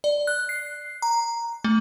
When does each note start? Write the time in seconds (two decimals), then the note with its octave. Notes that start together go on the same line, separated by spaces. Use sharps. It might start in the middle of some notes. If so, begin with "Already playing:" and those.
0.04 D5
0.27 F#6
0.49 C7
1.02 A#5
1.64 A3